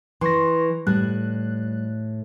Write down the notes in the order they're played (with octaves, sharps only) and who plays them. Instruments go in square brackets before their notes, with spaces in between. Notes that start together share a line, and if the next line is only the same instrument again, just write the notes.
[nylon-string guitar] E3 [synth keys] C6 C#6 A#6
[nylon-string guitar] A2 [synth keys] G3 F#6